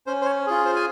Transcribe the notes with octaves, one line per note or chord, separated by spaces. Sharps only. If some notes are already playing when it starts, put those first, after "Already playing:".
C#4 C5
C5
C#5
F4 G#4
C5
G#5